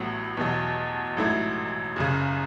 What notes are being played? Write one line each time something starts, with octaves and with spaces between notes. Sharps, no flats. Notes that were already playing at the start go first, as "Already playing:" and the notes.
Already playing: A1 A2 F#3 B3
E2 B2 F#3
A1 G#2 F#3 A3 E4
F#1 F#2 C#3